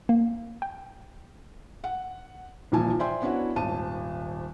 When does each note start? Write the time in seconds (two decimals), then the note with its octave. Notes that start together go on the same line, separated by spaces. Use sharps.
0.09 A#3
0.62 G5
1.84 F#5
2.72 D#1 A#1 A#2 E3 G#5 A5
2.99 C5 D5 E5 G5 G#5 C6
3.22 B3 C#4 D4 E4 F#4
3.56 D#1 G#1 A5 D#7